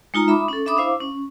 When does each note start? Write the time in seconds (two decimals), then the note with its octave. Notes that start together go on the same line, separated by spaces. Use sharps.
0.14 G#3 D#4 F4 A#5
0.28 E5 B5 D6 D#6
0.48 C#4 A4
0.66 D4 E5 B5 D6 D#6
0.77 E4 C5 F5 D6
1.01 C#4